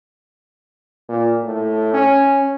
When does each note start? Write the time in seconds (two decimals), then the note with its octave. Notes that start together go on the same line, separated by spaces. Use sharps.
1.08 A#2
1.43 A2
1.93 C#4